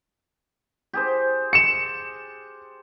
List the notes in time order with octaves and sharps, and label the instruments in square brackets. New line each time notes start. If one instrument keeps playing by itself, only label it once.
[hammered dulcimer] G4 G#4 C5
[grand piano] C#7 E7